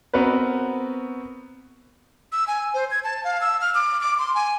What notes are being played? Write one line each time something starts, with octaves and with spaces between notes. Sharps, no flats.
B3 C4 F#4 A#4 B4
E6
G#5
C5
G#6
A5
F5
E6
F6
D6
D6
C6
G#5